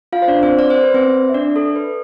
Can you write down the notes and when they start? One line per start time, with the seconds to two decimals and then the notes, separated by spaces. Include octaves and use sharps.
0.13 F4 F5
0.22 C5
0.28 D4 D5
0.43 C4 C5
0.59 D5
0.70 C5
0.83 B4
0.94 C4 C5
1.29 E5
1.34 D4 D5
1.56 A4
1.76 B4